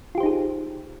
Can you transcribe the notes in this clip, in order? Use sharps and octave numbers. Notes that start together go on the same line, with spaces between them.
D#4 F4 G4 G#4 C5